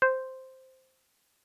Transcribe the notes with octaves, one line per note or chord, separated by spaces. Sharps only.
C5